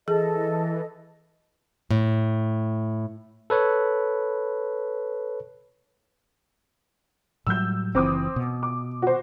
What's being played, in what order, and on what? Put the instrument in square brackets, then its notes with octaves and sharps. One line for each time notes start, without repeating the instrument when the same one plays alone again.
[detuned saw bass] E3 [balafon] G#4 [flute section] A4 D#5
[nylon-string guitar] A2
[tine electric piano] A4 B4 C#5
[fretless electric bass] A2 F#3 G3 [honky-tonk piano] E6 G6
[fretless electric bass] F#1 C#3 E3 [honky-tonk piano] C4 D6 D#6
[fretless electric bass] B2
[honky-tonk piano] D6
F#4 C5